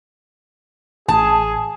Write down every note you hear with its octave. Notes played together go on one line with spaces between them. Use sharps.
A1 G#4 A5